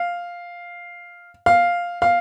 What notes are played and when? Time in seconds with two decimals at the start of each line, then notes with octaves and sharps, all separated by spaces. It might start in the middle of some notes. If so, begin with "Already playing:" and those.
Already playing: F5
1.46 F5
2.02 F5